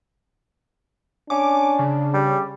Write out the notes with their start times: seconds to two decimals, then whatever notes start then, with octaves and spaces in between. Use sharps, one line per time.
1.30 C#4 D4 D6
1.79 C#3
2.14 G3